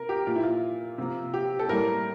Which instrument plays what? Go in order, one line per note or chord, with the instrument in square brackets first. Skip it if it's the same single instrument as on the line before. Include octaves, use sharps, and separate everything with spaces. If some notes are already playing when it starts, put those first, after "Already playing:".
Already playing: [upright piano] C3 C4 A#4
G4
A#2 F3 A#3 F4
E4
F4
C3 F3 A#3
G4
A4
A2 G3 A#3 A#4